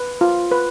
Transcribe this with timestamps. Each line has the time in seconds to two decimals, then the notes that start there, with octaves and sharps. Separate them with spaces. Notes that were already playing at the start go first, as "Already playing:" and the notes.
Already playing: B4
0.21 F4
0.52 B4